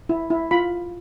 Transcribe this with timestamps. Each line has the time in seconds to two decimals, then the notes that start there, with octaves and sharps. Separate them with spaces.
0.09 E4
0.30 E4
0.51 F4 B5